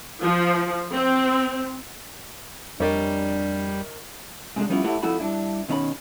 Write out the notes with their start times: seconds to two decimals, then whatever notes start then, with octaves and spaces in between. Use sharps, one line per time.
0.22 F3
0.95 C4
2.80 F2 G3 D4 A#4 C#5 D#5
4.56 G#2 C3 F#3 G#3 D4
4.69 F3 G3 B3 C#4 E4 F4
4.84 A2 A3 E4 G4 F#5
5.03 F2 A3 E4 F#4 F#5 B5
5.20 G2 D4 E4
5.69 B2 D#3 C#4 D5 B5